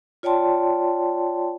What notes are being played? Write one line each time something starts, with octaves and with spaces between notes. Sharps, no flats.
F4 C#5 D5 G5 A5 C6